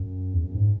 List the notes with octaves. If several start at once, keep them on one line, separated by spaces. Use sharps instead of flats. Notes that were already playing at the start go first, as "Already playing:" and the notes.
Already playing: F#2
E2
F#2
G#2